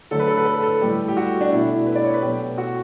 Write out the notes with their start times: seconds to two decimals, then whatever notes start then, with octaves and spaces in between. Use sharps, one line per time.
0.11 D3 F#3 A3 A4
0.19 B4
0.28 A4
0.37 B4
0.45 A4
0.54 B4
0.63 A4
0.81 A2 G3 G4
1.08 G4
1.17 F#4
1.41 D4
1.51 B2 A3 E4
1.86 B4
1.95 D5
2.04 C#5
2.14 B4
2.22 B2 F#3 A3 G4
2.58 F#4